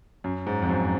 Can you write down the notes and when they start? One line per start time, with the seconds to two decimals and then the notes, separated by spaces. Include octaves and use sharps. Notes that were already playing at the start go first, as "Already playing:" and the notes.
0.24 F#2
0.47 G#2
0.62 F2
0.69 F#2